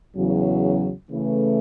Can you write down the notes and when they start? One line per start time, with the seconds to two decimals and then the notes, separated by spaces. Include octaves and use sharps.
0.16 E2 C#3 F#3
1.11 C#3 E3 A3